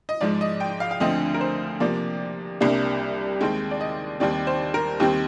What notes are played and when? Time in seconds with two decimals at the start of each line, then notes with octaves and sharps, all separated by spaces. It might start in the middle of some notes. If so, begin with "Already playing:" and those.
0.09 D#5
0.21 G#2 F3 G#3 D5
0.41 D#5
0.60 G5
0.80 F5
0.91 F5
1.00 D2 D3 F3 C4 D#5
1.34 A#4
1.41 C5
1.80 C3 F3 A#3 D5
2.60 C2 C3 G3 A#3 D4
3.41 D#2 D#3 G#3 C4 G5
3.71 D5
3.81 D#5
4.20 D#2 D#3 G3 C4 D5
4.47 C5
4.74 A#4
5.00 D#2 D#3 G3 C4 G4